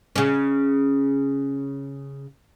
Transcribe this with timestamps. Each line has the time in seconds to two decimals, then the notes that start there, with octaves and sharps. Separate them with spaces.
0.16 C#3 C#4